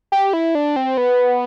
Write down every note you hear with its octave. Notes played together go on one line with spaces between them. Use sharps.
G4
E4
D4
C4
B3